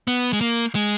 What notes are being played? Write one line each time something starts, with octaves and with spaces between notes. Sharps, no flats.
B3
G#3
A#3
G#3